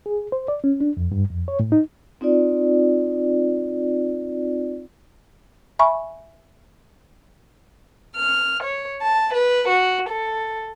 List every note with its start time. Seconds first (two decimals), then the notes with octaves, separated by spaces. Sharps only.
0.06 G#4
0.32 C5
0.48 D5
0.64 C#4
0.81 D4
0.97 F2
1.12 G2
1.30 F2
1.48 C#5
1.60 A2
1.72 D#4
2.21 C4 D#4 F4 D5
5.79 E5 G#5 B5 C#6
8.16 F6
8.63 C#5
9.01 A5
9.32 B4
9.67 F#4
10.08 A4